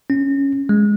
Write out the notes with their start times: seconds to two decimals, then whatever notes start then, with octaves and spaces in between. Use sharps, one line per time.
0.10 C#4
0.69 G#3